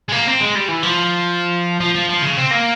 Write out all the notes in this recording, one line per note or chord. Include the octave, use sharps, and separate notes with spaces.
G#3
A#3
C4
G#3
G3
E3
F3
F3
F3
F3
C#3
C4
A#3